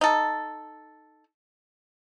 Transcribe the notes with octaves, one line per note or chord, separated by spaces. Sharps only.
D#4 A4